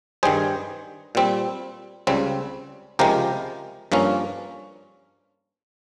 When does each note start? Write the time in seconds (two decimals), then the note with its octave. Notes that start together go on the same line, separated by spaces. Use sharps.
0.23 G2 D#3 G3 G#4 C5
1.15 A#2 G3 C4
2.07 C#2 C#3 G3 C4
2.99 C#2 C3 F3 G#3 G4 A#4
3.92 G2 F3 A#3 C#4